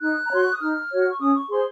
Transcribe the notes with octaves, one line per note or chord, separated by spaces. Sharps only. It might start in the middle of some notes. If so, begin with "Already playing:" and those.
D#4 F#6
A#5
F#4 C#5 C6
C#6
D#6
D#4 F6
F#4 C#5
C#6
C#4 D#6
C#6
G#4 C5 C6